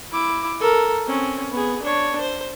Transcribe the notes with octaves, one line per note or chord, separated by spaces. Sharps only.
E4 D6
A4 A#4
C4 C#4
B3 G#4
D4 C#5
C5